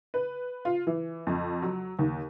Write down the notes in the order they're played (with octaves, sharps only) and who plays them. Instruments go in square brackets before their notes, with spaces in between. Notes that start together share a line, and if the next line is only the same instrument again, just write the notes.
[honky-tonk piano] B4
F4
E3
F2
F#3
D#2